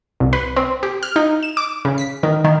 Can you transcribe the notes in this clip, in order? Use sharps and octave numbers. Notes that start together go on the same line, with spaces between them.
C2
B4
C4
G4
F6
D#4
E7
D6
C#3
B6
D#3
D#3